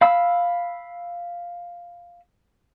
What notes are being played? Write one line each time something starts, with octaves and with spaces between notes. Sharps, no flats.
F5 B5 E6